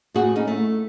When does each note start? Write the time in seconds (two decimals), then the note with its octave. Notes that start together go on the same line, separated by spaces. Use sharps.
0.14 A2 F#4 G#4
0.36 C#4 D#4
0.47 A3